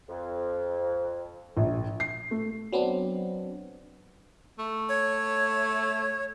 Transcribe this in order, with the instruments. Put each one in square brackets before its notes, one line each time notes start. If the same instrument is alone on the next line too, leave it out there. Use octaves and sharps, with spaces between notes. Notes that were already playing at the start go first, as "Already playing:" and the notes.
[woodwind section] F2
[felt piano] A#1
C7
A3
[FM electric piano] F#3 B3 C4 D4
[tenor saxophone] A3
[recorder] C#5